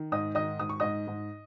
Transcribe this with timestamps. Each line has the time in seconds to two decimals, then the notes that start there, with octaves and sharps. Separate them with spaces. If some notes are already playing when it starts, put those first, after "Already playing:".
Already playing: D#3
0.12 G#2 D#5 D#6
0.35 D#3 D#5 D#6
0.59 G#2 D#6
0.69 C#6
0.80 G#2 D#5 D#6
1.07 G#2